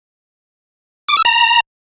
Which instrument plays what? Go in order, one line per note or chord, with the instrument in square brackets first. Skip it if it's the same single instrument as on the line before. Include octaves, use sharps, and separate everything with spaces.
[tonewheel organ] D6
E6
A#5